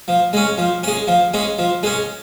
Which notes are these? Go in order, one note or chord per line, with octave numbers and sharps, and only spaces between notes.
F3
G#3 C#4
F3
G#3 C#4
F3
G#3 C#4
F3
G#3 C#4